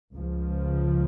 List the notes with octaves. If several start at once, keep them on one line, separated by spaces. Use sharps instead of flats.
C#2 C#3 F3